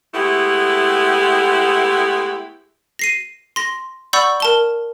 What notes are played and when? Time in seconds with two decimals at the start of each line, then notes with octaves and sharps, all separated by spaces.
0.14 G#3 A3 B3 E4 G4
2.99 A#6 C7 D#7
3.56 C6 A#6
4.13 D5 F#5 B5 C#6 E6 G6
4.40 A#4 A5 G7